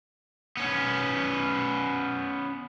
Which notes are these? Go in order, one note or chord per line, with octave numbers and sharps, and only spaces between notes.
B3 C#4